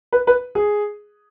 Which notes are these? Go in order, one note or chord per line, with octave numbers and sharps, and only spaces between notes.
B4
B4
G#4